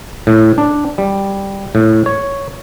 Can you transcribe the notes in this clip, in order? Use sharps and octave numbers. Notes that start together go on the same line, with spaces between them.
A2
D4
G3
A2
C#5